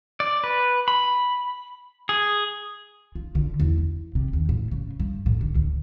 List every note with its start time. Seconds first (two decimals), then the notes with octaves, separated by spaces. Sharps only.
0.20 D5
0.44 B4
0.88 B5
2.09 G#4
3.15 F4
3.35 D3
3.60 E2
3.78 E4
4.15 C3
4.33 D#2
4.49 A2
4.71 C#3
4.99 G2
5.26 A2
5.41 D3
5.55 D2